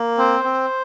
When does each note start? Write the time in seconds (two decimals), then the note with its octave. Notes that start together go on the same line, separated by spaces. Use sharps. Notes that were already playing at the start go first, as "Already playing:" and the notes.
Already playing: A#3
0.18 C4 C5
0.44 C4